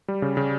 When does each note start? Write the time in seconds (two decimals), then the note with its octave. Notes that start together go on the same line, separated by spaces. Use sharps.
0.08 G3
0.22 C#3
0.37 C#3